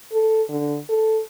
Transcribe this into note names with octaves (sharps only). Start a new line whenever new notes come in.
A4
D3
A4